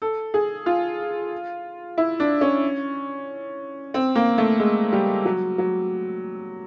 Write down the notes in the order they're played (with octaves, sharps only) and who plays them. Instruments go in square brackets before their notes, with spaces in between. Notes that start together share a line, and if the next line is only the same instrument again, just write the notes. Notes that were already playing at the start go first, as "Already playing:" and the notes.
[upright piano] A4
G#4
F4
E4
D4
C#4
C4
A#3
A3
G#3
G3
F#3
F#3